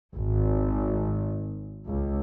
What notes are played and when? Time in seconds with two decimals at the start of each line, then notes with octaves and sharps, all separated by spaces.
0.15 G#1
1.88 C#2